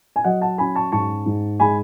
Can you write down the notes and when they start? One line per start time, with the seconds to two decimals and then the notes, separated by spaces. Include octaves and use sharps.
0.16 G#5
0.24 F#3 D#5 F#5
0.41 F#5 A5
0.58 C#4 G#5 B5
0.75 A5 C#6
0.92 G#2 A5 C#6
1.26 G#2
1.60 G#3 G#5 B5